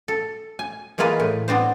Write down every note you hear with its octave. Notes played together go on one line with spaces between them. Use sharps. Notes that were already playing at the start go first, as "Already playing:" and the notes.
A4
G#5
E3 G#3 A#3 F4 G#4 B4
A2
B3 C4 D4 C5